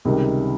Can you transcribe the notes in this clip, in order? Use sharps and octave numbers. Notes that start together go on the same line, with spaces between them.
C#2 C3 D#3 G3